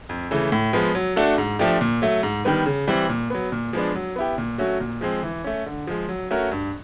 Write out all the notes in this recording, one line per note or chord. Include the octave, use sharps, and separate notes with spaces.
F2
C#3 E3 A3
A2
F3 G#3 B3
F#3
A3 D4 F#4 A4
G#2
F3 A3 D4 G4
A#2
F#3 A3
G#2
D#3 G3 B3
C#3
E3 G3 C4
A#2
F#3 B3
A#2
F3 G#3 B3 D4
F#3
B3 E4 G4
A#2
F#3 A3 C#4 F#4
A#2
F3 G#3 C4
E3
A3 C#4
D3
F3 G#3
F#3
A3 C#4 F#4 A#4
G2